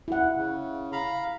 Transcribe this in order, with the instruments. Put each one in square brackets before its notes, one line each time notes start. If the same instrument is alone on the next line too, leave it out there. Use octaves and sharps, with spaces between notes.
[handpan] E4 F#5
[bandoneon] C#3
F5 A#5 B5